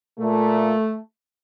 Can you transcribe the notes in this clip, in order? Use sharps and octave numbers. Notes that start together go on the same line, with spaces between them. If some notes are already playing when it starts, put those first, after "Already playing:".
A#2 A3